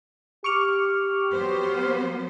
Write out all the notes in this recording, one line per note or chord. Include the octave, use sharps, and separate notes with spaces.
G4 C#6 D6 F6
F#3 B3 C5